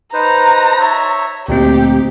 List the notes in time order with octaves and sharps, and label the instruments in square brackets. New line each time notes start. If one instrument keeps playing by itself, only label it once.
[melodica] D#4 B4 C5 [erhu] A#5
[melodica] C#5 E5
[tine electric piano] D2 A#2 C4 [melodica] D#4 [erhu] G4